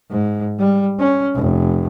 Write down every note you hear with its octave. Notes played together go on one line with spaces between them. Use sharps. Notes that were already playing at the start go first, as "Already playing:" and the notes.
G#2
G3
C#4
F1